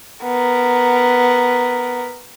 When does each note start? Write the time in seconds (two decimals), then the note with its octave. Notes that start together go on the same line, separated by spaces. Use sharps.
0.23 B3 A#4